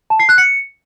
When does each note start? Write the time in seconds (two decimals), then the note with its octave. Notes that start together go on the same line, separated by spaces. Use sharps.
0.10 A5
0.20 C7
0.29 F#6
0.38 C#7